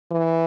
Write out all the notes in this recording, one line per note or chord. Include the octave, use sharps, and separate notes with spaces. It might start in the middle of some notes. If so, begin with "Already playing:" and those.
E3